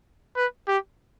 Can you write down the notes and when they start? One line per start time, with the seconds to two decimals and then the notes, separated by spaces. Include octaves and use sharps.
0.36 B4
0.68 G4